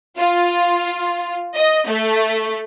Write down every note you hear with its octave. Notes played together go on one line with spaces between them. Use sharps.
F4
D#5
A3